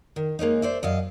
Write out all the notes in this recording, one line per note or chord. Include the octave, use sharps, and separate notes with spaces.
D#3
G#3 A#3 C#4 D#4
C5 D5 E5
F#2 D#5 F5